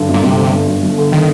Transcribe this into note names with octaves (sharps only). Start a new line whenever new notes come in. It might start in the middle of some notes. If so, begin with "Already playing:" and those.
Already playing: G2 D3
G1
A#2
G1 C3
D3
G2
G1
G1
D3
D#3